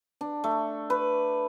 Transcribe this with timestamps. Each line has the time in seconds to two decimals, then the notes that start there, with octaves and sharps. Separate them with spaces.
0.21 D4
0.44 A3
0.90 B4